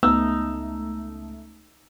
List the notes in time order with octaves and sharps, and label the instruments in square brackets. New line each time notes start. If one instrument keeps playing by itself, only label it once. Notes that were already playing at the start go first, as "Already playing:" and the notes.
[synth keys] C#2 A3 [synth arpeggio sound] B3 [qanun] D#4 [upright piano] E6